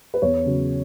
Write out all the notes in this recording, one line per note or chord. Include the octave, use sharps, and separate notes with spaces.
B4
E2 C#5
C#3 F#3